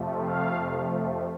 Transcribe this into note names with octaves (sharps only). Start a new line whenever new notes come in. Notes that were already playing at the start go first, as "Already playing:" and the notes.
Already playing: F2 C3 F3 A3
F5